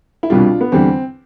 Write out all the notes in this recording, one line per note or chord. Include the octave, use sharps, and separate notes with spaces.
E4
C2 B2 G3 D4 F4
B3
E2 D3 G3 C4